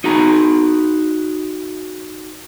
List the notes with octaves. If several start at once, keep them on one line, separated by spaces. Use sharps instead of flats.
D#4 F#4 G#4 A#5